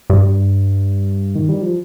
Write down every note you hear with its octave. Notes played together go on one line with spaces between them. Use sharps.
G2
D#3
G3
F3